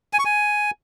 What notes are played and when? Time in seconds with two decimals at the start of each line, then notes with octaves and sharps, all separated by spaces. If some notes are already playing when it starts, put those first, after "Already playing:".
0.13 G#5
0.19 C#6
0.25 G#5